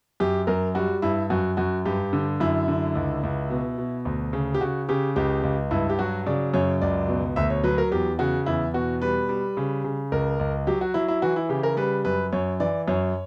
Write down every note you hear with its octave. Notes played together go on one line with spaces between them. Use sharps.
F#2 G4
F#2 A#4
G3 F#4
G2 E4
F#2 F#4
F#2 F#4
G2 G4
D3
F#2 E4
D3
C#2
C#2
B2
B2
D2
C#3
G4
C#3 F#4
C#3 G4
C#2 G4
C#2
G2 E4
G4
F#3 F#4
C#3 D5
F#2 C#5
C#2 D5
B2
D2 E5
C#5
F#3 B4
A#4
E2 G4
C#3 F#4
E2 E4
B2 F#4
G3 B4
G3
C#3
C#3
C#2 A#4
C#2
F#3 G4
F#4
F#3 E4
E4
E3 F#4
E4
C#3 G4
A#4
G3 B4
F#2 B4
F#2 C#5
E3 D5
F#2 C#5